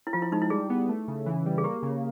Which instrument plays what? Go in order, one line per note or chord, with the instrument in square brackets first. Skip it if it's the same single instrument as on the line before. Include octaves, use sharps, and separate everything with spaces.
[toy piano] E4
[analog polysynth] F3 [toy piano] F4
[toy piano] E4
[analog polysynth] G#3 [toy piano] D#4
[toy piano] E4
[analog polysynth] G3 [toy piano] G#4
[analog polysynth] B3
A3
C#3
E3
G3
[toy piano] G#4
[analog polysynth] A#3 [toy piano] G4
[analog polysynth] C#3